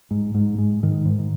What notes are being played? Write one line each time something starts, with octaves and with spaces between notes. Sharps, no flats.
G#2
G#2
G#2
G#2 D#3
G#2
D#3